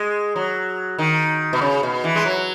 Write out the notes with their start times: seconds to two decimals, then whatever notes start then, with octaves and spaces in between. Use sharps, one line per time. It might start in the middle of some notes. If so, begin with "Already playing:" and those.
Already playing: G#3
0.36 F#3
0.99 D#3
1.53 B2
1.61 C#3
1.83 B2
2.04 E3
2.16 G#3
2.25 F#3